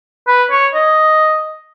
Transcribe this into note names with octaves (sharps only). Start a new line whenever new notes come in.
B4
C#5
D#5